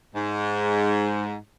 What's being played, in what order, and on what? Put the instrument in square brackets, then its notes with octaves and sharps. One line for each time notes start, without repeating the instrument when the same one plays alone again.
[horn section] G#2